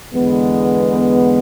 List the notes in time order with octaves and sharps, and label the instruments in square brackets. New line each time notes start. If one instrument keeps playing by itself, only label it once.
[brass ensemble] E2 D3 G#3 B3